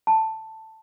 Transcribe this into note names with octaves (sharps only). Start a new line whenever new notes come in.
A5